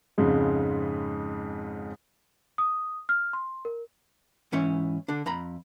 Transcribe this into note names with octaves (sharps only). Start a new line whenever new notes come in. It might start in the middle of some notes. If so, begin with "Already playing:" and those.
F2 G#2 C#3 G#3
D#6
F6
C6
A#4
G#2 E3 C#4 C#5
D3 D4
F2 A#5 B5